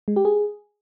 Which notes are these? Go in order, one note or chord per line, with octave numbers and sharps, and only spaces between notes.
G#3
G4
G#4